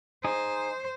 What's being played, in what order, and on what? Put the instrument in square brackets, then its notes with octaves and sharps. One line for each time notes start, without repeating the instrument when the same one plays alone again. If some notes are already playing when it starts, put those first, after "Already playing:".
[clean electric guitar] D#4 G#4 [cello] C5